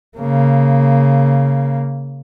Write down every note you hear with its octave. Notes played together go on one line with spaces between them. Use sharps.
C#3 A#3